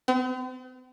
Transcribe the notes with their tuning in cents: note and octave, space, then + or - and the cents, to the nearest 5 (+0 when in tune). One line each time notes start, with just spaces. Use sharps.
C4 -45